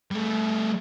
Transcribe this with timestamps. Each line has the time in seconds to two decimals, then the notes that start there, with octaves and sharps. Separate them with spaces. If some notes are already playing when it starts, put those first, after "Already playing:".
0.11 G3 A3